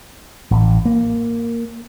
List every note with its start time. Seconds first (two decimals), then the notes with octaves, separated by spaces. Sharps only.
0.51 A1
0.85 A#3